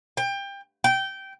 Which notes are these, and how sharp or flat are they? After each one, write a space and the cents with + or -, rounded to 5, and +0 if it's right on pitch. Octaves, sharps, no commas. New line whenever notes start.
G5 +25
G5 -15